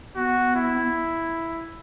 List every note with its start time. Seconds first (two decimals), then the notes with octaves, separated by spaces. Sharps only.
0.16 B3 F#4
0.56 E4